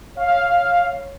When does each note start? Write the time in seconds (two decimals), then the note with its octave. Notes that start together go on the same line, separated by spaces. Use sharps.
0.17 C#5 F5